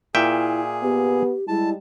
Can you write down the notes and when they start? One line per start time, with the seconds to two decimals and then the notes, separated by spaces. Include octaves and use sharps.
0.15 A#2 E4 G#4 E5 G5
0.83 B3 G4
1.48 G3 G#3 E4 A5